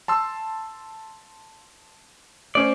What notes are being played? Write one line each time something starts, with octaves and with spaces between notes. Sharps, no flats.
A5 C6 E6
A3 C#4 C5 D5